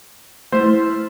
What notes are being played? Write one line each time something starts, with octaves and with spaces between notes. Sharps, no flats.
A3 E4 C5 F6